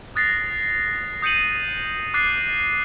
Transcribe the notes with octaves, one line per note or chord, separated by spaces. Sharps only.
D#6 F#6 A6 A#6 C7
D#6 G6 C#7 D#7 F#7
D6 F#6 A6 C7